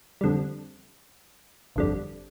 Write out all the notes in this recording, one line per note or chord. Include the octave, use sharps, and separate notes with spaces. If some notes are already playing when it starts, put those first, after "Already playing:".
F2 D3 G3
G1 F2 D3 G3